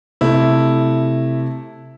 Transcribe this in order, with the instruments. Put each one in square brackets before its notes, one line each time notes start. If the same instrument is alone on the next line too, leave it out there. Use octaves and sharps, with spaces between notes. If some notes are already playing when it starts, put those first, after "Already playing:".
[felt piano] C3 A3 [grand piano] E4